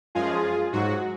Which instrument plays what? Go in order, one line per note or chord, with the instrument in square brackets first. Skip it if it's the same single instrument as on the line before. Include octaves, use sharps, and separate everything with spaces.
[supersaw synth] F#2 F3 G#3 F4 G#4
G#2 F#3 F#4